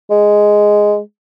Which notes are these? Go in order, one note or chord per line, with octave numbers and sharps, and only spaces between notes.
G#3